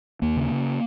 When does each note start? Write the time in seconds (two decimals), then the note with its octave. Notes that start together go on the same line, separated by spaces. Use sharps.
0.22 D#2 A#3
0.37 C#3
0.51 C#3